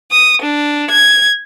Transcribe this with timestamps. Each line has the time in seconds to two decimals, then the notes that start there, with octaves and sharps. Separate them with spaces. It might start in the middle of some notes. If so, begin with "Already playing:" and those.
0.11 D#6
0.42 D4
0.90 G#6